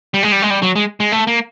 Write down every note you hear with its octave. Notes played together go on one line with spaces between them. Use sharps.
G3
G#3
G3
G#3
G3
F#3
G#3
G#3
A3
A#3